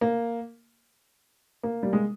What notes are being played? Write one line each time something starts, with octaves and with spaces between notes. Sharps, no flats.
A#3
A#3
G3
G#3